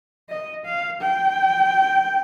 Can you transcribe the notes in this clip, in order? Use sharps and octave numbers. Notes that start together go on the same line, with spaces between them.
D#5
F5
G5